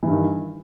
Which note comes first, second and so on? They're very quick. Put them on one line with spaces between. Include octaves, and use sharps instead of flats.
E3 G2 D#3